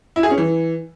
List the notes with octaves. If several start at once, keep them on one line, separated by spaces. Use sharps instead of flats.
E4
G#4
C#4
E3